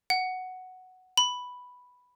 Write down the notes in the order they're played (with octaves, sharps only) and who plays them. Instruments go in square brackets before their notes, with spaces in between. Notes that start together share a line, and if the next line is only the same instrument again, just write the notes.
[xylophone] F#5
B5